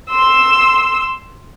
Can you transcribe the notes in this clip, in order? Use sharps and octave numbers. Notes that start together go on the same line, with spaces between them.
C6 E6